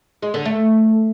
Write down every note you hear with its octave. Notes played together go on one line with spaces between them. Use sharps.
G#3
D3
A3